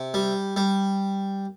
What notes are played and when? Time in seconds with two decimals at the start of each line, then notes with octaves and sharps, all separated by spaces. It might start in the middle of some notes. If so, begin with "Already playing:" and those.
Already playing: C3
0.14 G3
0.56 G3